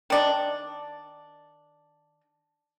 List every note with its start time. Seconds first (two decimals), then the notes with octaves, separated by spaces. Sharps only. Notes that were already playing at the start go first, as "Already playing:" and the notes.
0.10 D#3 D4